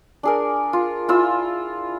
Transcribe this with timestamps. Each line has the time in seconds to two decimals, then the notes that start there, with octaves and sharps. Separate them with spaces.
0.23 D4 G#4 A#4
0.73 F4
1.08 E4 F4 E6